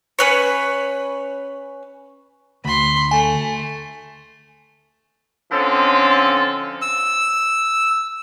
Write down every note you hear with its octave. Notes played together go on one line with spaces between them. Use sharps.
C#4 B4 C#5
D2 B5 C6
A3 G#5
D3 F3 C4 C#4 D#4 A4
E6